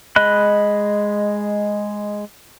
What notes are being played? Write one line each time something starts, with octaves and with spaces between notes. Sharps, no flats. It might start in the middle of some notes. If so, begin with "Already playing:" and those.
G#3 D#5 B5 F#6